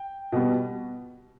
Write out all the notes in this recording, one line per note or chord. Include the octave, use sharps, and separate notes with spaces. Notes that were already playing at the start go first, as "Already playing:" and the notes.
Already playing: G5
B2 G3 B3